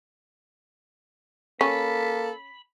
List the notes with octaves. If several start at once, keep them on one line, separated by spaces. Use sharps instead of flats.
A#3 C#4 A4 B5